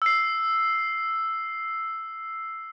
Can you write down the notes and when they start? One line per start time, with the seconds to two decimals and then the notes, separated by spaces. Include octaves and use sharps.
0.02 E6 C7